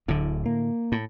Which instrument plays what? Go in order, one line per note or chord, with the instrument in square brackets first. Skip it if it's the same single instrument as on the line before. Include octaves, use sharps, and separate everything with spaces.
[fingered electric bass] D1 [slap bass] A2 D3
[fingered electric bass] A#3
[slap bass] A2